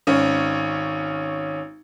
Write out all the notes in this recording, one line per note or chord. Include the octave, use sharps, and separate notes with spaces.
G#1 C#4